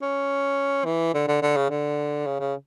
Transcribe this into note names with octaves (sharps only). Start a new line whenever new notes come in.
C#4
E3
D3
D3
D3
C#3
D3
C#3
C#3